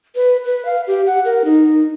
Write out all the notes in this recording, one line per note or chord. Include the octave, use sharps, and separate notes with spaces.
B4
B4
F5
G4
F#5
A#4
D#4